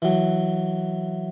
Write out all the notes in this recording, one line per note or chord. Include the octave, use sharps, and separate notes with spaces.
E3 F#3